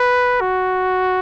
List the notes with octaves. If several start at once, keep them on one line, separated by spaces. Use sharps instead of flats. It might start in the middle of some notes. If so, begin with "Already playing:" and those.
Already playing: B4
F#4